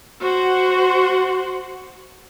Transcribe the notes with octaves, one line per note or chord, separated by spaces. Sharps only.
F#4 C5 F#5